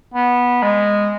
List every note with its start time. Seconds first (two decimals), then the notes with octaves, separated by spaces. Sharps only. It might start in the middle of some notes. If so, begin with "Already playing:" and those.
0.14 B3
0.63 G#3